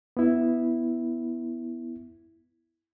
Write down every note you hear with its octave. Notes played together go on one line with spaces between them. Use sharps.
B3 E4